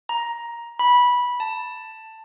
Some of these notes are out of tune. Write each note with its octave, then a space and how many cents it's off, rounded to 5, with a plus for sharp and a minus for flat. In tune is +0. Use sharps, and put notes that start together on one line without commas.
A#5 +10
B5 -15
A5 +10